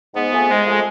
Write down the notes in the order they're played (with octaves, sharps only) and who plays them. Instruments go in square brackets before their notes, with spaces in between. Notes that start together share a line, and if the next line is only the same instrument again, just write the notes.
[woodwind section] G#2 [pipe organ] B3
[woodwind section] F3 A3 C4 G#4
[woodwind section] G#2 [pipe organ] G#3
[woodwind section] F3 A3 C4 G#4